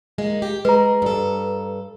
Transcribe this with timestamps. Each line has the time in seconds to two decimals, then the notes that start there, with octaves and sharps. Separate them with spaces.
0.18 G#3 A#3 D#4
0.42 G4
0.65 G#3 B4 A#5
1.02 G2 A4